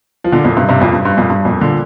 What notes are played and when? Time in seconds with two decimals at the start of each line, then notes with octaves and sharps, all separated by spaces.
0.24 F3
0.32 A#2 D3
0.44 F2 A#2
0.57 G2 C3
0.69 G2 C3
0.81 F2 A#2
0.93 G2
1.05 G2
1.17 F2 A#2
1.30 G2
1.45 F2 A#2
1.61 A#2 D3